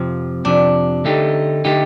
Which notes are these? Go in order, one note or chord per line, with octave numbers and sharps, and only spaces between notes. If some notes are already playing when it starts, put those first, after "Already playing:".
Already playing: F2 C3 F3 C4
F2 C3 F3 D4
D3 A3 D#4 G4
D3 A3 D#4 G4